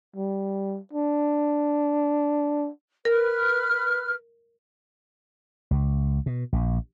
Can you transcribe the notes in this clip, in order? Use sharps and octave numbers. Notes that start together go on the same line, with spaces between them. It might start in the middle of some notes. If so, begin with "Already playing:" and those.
G3
D4
A#4 B4 F6
C#2
B2
A#1